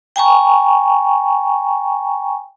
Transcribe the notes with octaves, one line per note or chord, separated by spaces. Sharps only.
G5 G#5 A#5 C#6